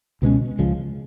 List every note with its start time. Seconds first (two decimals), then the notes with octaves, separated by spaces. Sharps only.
0.22 C#2 B2 G#3 C#4
0.59 C#2 C#3 F3 G#3